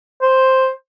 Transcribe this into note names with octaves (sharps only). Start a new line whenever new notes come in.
C5